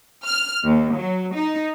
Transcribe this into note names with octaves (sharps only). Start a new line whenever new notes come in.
F6
D#2
F#3
D#4